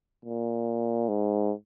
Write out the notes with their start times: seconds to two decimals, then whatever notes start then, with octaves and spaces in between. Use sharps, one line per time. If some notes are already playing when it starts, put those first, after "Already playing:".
0.25 A#2
1.08 G#2